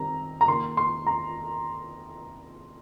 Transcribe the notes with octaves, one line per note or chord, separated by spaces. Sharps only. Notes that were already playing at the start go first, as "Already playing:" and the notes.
Already playing: D#3 G3 C4 A#5
A#5
D#3 A#3 C6
C6
A#5